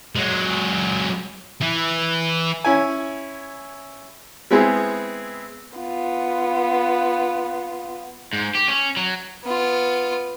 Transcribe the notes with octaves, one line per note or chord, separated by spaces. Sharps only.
F#3 G#3
E3
C#4 E4 G#5
G#3 B3 C4 E4 G#4
B3 F4
G#2
G4
C#4
F#3
B3 F4